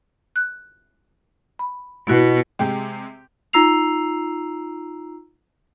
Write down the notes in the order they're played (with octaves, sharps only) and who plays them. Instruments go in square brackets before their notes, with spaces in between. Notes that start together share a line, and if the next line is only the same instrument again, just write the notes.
[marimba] F#6
B5
[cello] B2 [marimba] B3 E4 F#4
[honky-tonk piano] C3 G#3 [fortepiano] G4 G5
[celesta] D#4 F4 A#5 E6 C7 F7